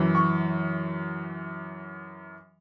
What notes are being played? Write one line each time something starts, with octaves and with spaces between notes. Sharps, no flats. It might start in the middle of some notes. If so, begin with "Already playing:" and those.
Already playing: F#2 E3
C#6